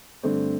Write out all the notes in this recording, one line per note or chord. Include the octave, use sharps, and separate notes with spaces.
G2 D3 A3 C4